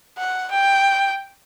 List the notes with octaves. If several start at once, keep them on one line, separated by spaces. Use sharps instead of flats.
F#5
G5